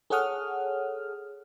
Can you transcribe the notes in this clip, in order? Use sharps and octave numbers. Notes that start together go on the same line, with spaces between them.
G#4 A4 C#5 F#5 D#6 F6